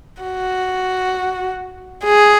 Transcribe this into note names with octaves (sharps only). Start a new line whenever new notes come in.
F#4
G#4